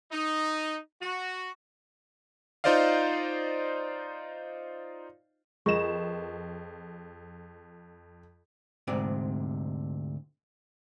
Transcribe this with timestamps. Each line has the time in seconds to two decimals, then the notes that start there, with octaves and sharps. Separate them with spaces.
0.11 D#4
1.01 F#4
2.64 D#4 F4 C5 D5 D#5 F5
5.66 F2 G#4 A#4 B4 D#5 C#6 E7
8.87 D2 G#2 C3 D5